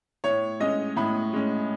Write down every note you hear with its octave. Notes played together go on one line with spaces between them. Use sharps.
A2 C#5
G#3 C#4 D#5
A2 B5
G#3 C#4